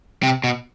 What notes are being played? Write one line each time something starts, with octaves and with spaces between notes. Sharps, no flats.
C3
B2